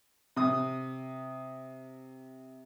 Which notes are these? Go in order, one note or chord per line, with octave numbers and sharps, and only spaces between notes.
C3 D#6